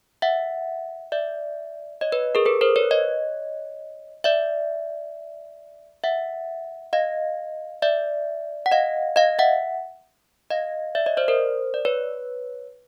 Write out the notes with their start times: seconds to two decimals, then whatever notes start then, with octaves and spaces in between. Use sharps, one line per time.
0.22 E5 F#5
1.12 D5 E5
2.01 C#5 D#5
2.12 B4 C#5
2.35 G#4 A#4
2.46 A4 B4
2.61 A#4 C5
2.76 B4 C#5
2.91 C#5 D#5
4.24 D5 E5
6.04 E5 F#5
6.93 D#5 F5
7.82 D5 E5
8.66 F#5
8.71 D#5 F5
9.16 D#5 F5
9.39 E5 F#5
10.50 D#5 F5
10.95 D5 E5
11.06 C#5 D#5
11.17 C5 D5
11.28 A#4 C5
11.74 D5
11.85 B4 C#5